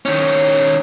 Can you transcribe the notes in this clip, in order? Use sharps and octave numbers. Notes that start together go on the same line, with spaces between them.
D#3 C#4